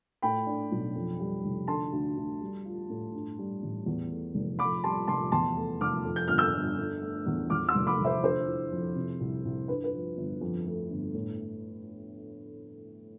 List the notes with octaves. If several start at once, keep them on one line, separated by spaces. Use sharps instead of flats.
A2 G5 B5
D4
B1
F2
G3
F1
D3 A5 C6
D2
D2
G3
F4
A2
G2
G3
A1
E2
A3
F1
F2 B5 D6
G3 A5 C6
F1 A5 C6
E2 A5 C6
A3
F1 D6 F6
F2
G6
G1 F6
E6 G6
G1
D3
A3
E2
E2 D6 F6
C6 E6
F1
B5 D6
F1
C5 E5
D3 C5
E4
F2
C3
C2
C2
G2 B4
B4
F3
G1
F2
A3
G1
A2